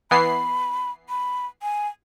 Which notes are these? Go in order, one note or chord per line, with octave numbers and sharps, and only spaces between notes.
E3 B3 B5 C7
B5
G#5